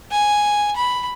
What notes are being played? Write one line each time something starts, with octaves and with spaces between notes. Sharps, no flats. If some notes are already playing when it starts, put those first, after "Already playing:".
G#5
B5